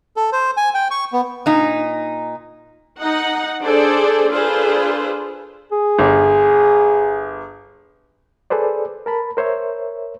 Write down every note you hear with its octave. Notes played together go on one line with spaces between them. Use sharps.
A4
C5
G#5
G5
C#6
B3
A#2 D#4
D#4 F#5
D4 G#4 A4 C5 D5
D4 F4 G#4 A4 B4 C5
G#4
G1
G#4 A4 B4 C5 D5
A#4 A5 B5
A#4 C5 C#5 E5